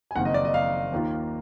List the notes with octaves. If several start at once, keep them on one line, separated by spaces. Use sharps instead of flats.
G#5
F#1 F2 D#3 A#3 D#4 F#5
D#5
D5
D#5
F5
D#2 D#3 A#3 F4